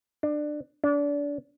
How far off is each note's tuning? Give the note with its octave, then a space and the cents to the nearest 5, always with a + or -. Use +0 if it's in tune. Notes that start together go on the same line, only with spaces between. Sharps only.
D4 +20
D4 -30